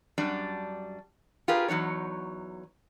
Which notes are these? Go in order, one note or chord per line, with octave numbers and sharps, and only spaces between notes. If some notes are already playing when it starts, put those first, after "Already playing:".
F#2 G3 D4
F4 G4 G#4 A#4 B4
E2 F#3 D#4 C#5